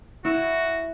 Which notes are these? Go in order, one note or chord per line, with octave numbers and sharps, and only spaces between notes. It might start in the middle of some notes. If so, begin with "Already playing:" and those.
E4 F#4